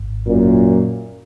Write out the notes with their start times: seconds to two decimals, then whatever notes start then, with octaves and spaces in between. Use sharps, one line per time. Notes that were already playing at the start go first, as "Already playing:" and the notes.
Already playing: G#1
0.27 F#2 A#2